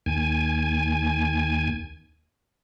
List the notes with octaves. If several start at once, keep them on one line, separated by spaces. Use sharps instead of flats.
D#2 G#5